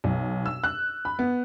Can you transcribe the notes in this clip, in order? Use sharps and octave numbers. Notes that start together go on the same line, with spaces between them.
B1
E6
F#6
B5
B3